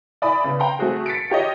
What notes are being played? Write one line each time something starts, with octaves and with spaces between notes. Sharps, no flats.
E4 D5 G#5 B5 D#6
C#3 B3
G5 A#5 C6
A3 C4 F#4 G#4
A6 B6 C#7 D7
F4 G4 C#5 D#5